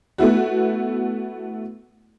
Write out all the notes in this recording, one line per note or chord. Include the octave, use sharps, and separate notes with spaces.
A3 B3 E4 F#4